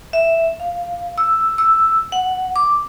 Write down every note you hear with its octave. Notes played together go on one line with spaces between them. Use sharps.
E5
F5
E6
E6
F#5
D6